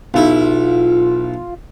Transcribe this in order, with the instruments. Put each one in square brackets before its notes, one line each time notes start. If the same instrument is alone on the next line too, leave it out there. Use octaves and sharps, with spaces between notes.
[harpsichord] B1 E4 [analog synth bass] F4